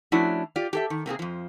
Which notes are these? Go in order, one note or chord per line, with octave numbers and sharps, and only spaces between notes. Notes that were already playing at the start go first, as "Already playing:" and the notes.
F3 A3 C#4 D4 E4 F#4
F4 G4 D5
G4 A4 E5
D#3
C3 A#3 C4 G#4
F2 F3